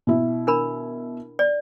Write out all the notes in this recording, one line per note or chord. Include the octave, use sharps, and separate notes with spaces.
B2 E4
D4 A#4 B5
D5